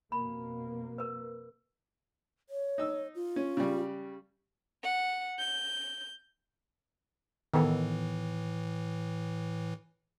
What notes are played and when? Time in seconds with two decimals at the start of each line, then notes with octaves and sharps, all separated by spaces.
0.12 F2 B2 A#3 B5
0.98 A#4 B4
2.50 C#5
2.78 D#4 E6
3.15 F4
3.36 C#4
3.57 C#3 G3
4.83 F#5
5.39 G6
7.54 A2 D#3 E3 B3 A4